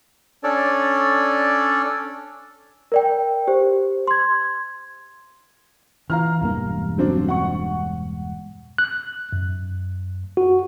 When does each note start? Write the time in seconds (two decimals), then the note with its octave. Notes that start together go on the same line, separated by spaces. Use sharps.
0.44 C#4 D4 A4 C#5 D5
2.92 A#4 D5 G5
3.47 G4 C5
4.07 C6 G#6
6.10 E3 F5 A#5 F6
6.42 E1 G2 A#3
6.98 F#3 C4 D4
7.28 F#5 C#6
8.78 F#6
9.32 F#2
10.37 F#4